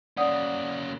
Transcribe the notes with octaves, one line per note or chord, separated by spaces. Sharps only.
A#3 C#4 D5 F#5 D#6